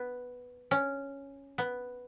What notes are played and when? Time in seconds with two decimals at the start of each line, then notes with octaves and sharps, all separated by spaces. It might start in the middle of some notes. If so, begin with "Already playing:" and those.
Already playing: B3
0.71 C#4
1.58 B3